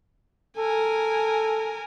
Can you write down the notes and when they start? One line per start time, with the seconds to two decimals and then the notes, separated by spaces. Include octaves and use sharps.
0.57 A4 A#4 G#5